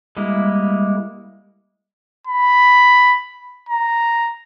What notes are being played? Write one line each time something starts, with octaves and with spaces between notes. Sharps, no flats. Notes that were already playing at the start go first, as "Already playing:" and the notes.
G3 G#3 A#3 E4
B5
A#5